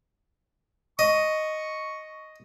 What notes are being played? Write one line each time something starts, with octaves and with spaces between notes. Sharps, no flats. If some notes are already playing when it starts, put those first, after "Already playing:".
D#5 C#6